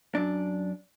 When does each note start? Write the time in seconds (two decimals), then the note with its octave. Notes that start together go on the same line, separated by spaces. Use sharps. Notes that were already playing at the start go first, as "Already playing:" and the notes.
0.15 F#2 D4